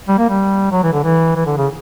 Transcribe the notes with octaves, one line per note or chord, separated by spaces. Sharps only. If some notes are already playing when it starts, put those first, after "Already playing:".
G3
A#3
G3
F#3
E3
D3
E3
E3
D3
C#3